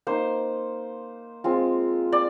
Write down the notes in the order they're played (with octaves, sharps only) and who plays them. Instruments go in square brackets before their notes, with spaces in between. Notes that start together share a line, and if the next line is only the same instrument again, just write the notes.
[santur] A#3 D#4 C5
G#3 C4 F4
D5